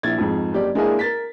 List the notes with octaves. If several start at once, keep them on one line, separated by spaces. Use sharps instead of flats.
A#1 E4 G#6 A6
F2 G#2
F#1 G4 D5
G#3 A#3 D4 E4 G#4 A#4
A#4 A6 B6